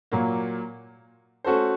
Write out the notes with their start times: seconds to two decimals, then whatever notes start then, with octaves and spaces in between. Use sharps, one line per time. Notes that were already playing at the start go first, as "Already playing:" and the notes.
0.12 A#2 F#3 A#3
1.44 A3 C#4 F#4 A4 C5